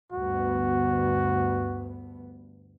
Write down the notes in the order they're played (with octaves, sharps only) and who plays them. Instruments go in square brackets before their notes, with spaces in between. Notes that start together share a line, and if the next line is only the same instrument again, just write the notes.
[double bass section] D2 G2 B3 [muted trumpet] F#4